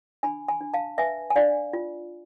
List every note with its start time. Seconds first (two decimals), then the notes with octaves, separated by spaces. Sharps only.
0.23 D4 G#5 B5
0.48 G#5 B5
0.61 D4
0.74 F5 A5
0.98 B4 E5 G#5
1.30 G#5
1.36 D4 D5 F5
1.73 F4